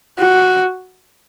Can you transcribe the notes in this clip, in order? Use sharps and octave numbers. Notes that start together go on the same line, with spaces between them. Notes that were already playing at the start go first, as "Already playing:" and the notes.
F#4